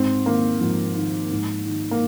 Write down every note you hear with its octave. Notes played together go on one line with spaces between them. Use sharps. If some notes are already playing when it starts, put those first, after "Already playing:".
Already playing: G#2 C4
D#3 A#3
G#2 F3
D#3
G#2
D#3
A#3